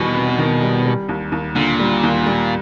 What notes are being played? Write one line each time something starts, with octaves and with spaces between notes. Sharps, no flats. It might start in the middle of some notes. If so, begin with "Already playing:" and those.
Already playing: E2 B2 D#3 G3
C3
D#3
G3
G3
D#2
D#2
A#2 D3
G3
D#2
G3